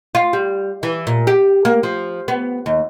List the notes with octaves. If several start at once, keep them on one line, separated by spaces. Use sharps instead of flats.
F4
G3
E3
A#2
G4
A#3
F3
B3
D#2